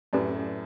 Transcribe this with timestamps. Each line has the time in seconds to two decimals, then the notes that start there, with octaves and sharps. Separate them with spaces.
0.13 F#2 A2 C#4 G4 B4 D5